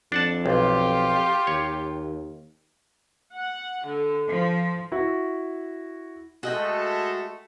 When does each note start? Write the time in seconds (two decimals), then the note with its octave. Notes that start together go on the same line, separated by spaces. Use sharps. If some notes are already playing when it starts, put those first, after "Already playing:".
0.12 F2 D4 F#5 A5
0.46 B1 F4 G4
1.47 D#2 C#5
3.32 F#5
3.85 D3
4.29 F3
4.92 E4 F#4
6.43 G#3 A3 F#4 A4 D#5 G5